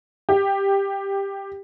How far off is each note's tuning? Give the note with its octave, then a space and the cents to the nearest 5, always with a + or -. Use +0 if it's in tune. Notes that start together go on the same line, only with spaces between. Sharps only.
G4 +10